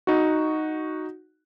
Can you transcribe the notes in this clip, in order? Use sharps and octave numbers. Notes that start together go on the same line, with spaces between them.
D#4 F#4